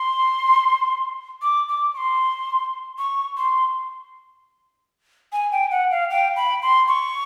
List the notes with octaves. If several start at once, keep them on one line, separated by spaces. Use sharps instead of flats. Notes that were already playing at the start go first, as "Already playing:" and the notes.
Already playing: C6
D6
D6
C#6
C6
C#6
C6
G#5
G5
F#5
F5
G5
B5
C6
C#6